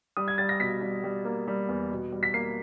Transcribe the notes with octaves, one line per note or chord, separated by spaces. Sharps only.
G3 D#6
G#6
G3 A6
A#6
B2 B6
G3
G3
A#3
G3
E2
B2
G3
B6
A#3 C7